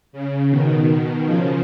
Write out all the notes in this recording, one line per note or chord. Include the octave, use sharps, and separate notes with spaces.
C#3
B2 D#3
C#3 F3